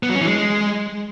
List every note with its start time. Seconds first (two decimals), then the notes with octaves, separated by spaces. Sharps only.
0.03 B3
0.09 F#3
0.15 C#4
0.21 E3
0.27 G#3